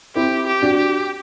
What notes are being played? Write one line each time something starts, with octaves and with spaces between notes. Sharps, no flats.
C4 E4 G4
G4
D4 F#4
G4